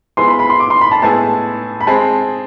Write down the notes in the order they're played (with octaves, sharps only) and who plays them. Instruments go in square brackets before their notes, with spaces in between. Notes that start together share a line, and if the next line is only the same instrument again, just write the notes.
[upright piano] F3 G#3 B3 E4 G#4 [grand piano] C6
[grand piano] B5
B5
C6
D6
C6
B5
A5
[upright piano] A2 G#3 B3 E4 G#4 [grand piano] A5
[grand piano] B5
[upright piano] G#3 C4 G#4 [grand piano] A5